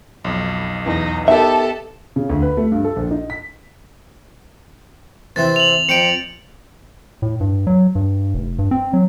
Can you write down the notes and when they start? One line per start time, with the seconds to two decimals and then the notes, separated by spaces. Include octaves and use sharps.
0.24 B1 F2
0.86 E2 D#4
1.28 B3 D#4 G4 A4 A#4 E5 A5
2.16 C#3
2.29 D2
2.42 B4
2.57 A3
2.72 G2
2.84 A4
2.96 A#1
3.11 D#4
3.30 B6
5.36 C3 E3 C4 A6
5.56 F7 F#7
5.89 F2 G5 C#7 D7
7.22 A2
7.41 G2
7.67 F#3
7.95 G2
8.34 F1
8.59 G2
8.71 C4
8.93 F#3